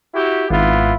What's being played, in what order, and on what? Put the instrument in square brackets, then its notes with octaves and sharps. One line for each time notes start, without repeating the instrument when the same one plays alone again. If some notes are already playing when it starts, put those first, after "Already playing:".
[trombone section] E4 F#4 G4
[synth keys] G#1 [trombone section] B3 E4 F4